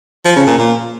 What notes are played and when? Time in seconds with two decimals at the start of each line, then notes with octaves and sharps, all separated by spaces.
0.25 F3
0.36 C#3
0.47 A#2
0.58 A#2